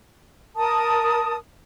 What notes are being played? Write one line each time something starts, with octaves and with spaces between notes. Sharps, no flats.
A#4 A5 D#6